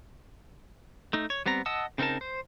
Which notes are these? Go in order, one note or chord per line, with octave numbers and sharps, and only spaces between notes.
A3 D#4
C#5
G3 B3 C4 A#5
D#5 F#5 A5 D#6 E6
C#3 C4 D#4 A#4 A5
C5